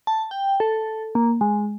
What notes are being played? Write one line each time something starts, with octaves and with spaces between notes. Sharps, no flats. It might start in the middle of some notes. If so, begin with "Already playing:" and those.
A5
G5
A4
A#3
G#3